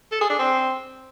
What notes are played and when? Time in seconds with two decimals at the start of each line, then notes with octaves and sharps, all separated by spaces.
0.12 A4
0.21 G#4
0.30 D4
0.39 C4